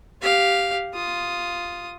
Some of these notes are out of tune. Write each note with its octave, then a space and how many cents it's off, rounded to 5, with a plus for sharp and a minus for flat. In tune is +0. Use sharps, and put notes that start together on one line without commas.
G4 +0 F5 +0
F4 +0 D#6 +0